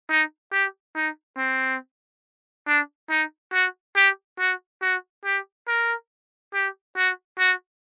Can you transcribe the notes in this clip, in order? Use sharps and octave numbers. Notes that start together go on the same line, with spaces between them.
D#4
G4
D#4
C4
D4
D#4
F#4
G4
F#4
F#4
G4
A#4
G4
F#4
F#4